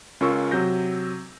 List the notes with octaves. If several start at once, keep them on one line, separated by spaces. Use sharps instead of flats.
C#2 C#4 F4 A#4 C#6 E6
C3 F#3 G6 A#6